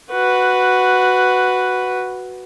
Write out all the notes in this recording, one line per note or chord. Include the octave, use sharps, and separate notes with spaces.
F#4 B4